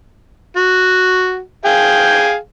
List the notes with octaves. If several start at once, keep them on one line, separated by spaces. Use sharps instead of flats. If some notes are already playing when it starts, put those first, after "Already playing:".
F#4
G#4 F5 G5